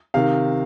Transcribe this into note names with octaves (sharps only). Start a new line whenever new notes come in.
C3 D#3 F5